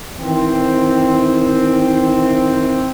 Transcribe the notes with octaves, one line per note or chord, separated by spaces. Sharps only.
D#3 E3 C4